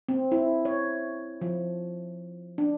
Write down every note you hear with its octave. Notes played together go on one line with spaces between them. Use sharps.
C4
E4
C#5
F3
D4